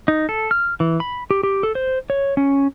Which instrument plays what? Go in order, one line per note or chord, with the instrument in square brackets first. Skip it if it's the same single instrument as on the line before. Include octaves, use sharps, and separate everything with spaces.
[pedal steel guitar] D#4
A4
F6
E3
B5
G4
G4
A4
C5
C#5
C#4